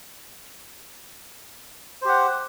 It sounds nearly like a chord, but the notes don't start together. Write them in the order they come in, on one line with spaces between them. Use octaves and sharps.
C5 G4 F#5